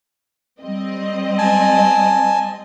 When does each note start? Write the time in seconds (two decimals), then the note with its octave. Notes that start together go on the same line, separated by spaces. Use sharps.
0.61 G3 C4 D#5
1.38 G#5 A5